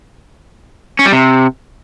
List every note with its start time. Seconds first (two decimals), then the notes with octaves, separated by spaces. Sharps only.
0.99 C#4
1.06 G3
1.12 C3